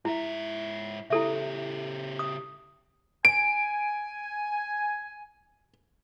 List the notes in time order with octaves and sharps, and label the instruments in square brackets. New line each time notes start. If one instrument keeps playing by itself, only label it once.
[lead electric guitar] G#2 E5 [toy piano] E4
[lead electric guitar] C#3 G4 [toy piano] E4 A4 E5
[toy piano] D#6
[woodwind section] G#5 [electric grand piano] D7